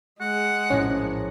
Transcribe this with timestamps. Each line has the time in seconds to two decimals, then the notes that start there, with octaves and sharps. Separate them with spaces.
0.21 G#3 F#5
0.70 A#1 A2 C#4 A#6